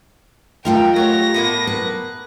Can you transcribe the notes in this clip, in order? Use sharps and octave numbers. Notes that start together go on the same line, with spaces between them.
A3 F4 A#4 D#5 G5
F#3 G4 C#5 A#6
A2 A#3 B3
B4